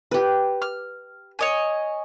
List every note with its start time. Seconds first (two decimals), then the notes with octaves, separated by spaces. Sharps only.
0.11 G4 B4
0.62 F6
1.39 C#5 D#5 G#5